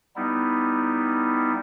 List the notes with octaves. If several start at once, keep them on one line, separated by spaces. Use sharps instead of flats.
G3 B3 D#4 E4